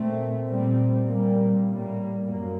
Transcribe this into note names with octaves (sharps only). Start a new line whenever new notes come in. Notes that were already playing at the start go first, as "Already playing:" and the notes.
Already playing: A#2 A3 C4
A#2 G3 C4
A#2 G3 A#3
A2 G3 A#3
F#2 F#3 A#3